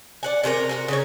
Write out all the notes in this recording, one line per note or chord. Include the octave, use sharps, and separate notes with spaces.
D5 F#5 G#5
C3 C#4 F#4 A#4
F#4 A4 A#4
C#3 D#4 C#5